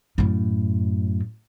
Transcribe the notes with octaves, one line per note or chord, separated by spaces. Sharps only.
F#2 A2